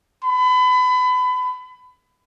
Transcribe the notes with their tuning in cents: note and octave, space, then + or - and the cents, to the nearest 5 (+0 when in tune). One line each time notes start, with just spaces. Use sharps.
B5 +30